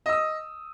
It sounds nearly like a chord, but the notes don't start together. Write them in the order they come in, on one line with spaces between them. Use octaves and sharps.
D#5 E6 D#6